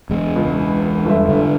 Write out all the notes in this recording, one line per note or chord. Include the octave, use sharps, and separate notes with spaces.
E1 G#3
C#2
G1 E5
G2 D3